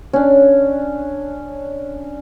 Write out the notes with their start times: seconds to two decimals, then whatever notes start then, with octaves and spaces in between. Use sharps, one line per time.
0.13 C#4 D4